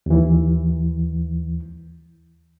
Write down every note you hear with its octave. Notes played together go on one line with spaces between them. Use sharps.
D#2 E3